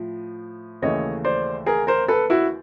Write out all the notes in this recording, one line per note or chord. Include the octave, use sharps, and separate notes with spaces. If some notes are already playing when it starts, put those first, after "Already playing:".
Already playing: A2 F3
D#2 C#3 E3 A3 C#5 D#5
C5 D5
G#4 A#4
A#4 C5
A4 B4
E4 F#4